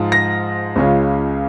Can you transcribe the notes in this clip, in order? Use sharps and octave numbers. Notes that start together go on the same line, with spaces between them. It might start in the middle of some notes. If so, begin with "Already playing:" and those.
Already playing: G#2 F3 G#3 F4
A#6
C#2 C#3 G#3 C#4 F4